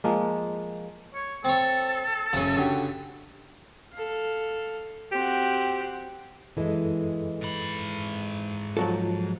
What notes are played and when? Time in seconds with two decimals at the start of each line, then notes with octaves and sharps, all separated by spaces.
0.04 F3 G#3 A#3
1.14 C#5
1.44 C4 A4 C#5
2.33 F#1 F#2 C#3 C#4
2.56 D3 F#4 G4
3.94 A4 F5
5.12 C4 F#4 G4
6.57 F#2 E3 G#3 A4 D#5
7.41 G#2 B5
8.77 F3 F#3 F4 A4